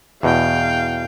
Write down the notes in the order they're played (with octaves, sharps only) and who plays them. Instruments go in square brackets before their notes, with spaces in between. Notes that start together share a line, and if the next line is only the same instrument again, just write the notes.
[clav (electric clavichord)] E2 B2 [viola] F5 G5